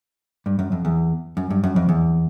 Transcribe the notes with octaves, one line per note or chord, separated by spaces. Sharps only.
G2
F#2
F2
E2
F#2
G2
F#2
F2
E2